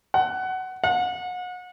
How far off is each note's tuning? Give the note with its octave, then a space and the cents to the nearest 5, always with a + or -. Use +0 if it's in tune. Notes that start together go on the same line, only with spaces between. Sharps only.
F#5 +15
F#5 -35